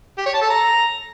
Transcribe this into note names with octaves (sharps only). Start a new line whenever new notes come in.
G4
C#5
A5
A4
A#5